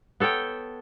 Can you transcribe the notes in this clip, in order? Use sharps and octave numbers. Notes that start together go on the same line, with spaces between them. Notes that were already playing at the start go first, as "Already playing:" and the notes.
B3 A4 C#5 G5